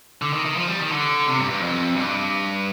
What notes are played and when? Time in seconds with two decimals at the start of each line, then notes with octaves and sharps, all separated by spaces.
0.22 D3
0.33 D#3
0.45 D#3
0.57 F3
0.68 G3
0.80 D#3
0.92 D3
1.27 C3
1.38 G2
1.50 G2
1.62 F2
1.96 G2